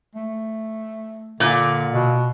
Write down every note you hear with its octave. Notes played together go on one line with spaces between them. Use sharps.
A3
A#2 D3
B2